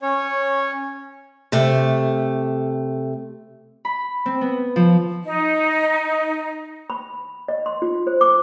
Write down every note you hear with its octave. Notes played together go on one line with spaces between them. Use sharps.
C#4 C#5
C3 A3
B5
C4
B3
F3
D#4
B5
D#5
C6
F4
C5
D6